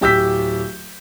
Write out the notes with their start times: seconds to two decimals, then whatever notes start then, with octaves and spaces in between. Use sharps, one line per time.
0.01 D1 G4 E6 G6 B6